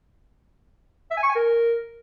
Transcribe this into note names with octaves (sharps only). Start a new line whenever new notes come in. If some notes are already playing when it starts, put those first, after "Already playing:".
E5
G#5
C#6
G#5
A#4